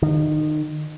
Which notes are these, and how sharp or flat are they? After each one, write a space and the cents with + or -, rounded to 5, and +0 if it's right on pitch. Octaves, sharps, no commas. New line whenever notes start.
D#3 -30